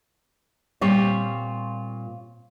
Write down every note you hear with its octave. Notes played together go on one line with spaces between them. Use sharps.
A#2 G3 C4 F4 C#5